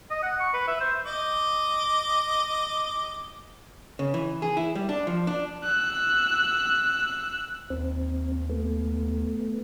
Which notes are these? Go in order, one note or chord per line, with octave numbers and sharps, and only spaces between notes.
D#5
F#5
C#6
B4
E5
C5
D#5 D6
C#3
E3
G#4
E4
G3
D4
F3
D4
E6 F#6
D#2 C4
A3 B3